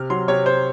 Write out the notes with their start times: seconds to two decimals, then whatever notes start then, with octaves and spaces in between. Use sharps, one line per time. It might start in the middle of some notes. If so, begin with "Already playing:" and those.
Already playing: C3 F6
0.10 F#3 C6
0.28 C3 C#5
0.46 C3 C5